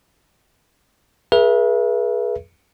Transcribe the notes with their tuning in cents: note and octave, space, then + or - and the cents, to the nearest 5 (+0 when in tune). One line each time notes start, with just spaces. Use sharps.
G#4 +10 B4 -40 E5 +25